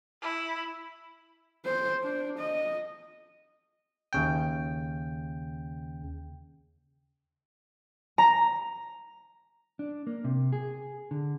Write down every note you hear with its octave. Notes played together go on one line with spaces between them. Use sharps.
E4
C5
D4
D#5
D#2 C#3 G5
A#5
D4
A#3
C3
G#4
D3